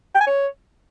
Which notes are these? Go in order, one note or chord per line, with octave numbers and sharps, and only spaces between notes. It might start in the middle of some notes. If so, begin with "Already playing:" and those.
G5
G#5
C#5